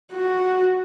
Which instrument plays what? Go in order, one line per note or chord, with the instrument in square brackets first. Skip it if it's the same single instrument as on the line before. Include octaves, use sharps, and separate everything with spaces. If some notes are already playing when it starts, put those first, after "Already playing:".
[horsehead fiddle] F#4